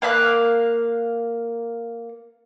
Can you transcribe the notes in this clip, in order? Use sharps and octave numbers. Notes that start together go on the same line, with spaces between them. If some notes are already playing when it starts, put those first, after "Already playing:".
A#3 F5 B5 F#6